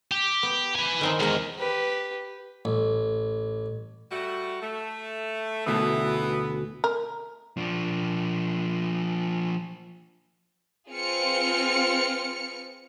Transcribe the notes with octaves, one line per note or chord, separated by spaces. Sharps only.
G4
B3
B4 G#5
D#3 C4 D#4
E2 G#3 A#4 G#5
G4 B4
A1
G3 A3 F#4
A3
D2 B2 E3 A3 B3
A#4
F3 D4
C4 F4 G#4 B4 F6 C#7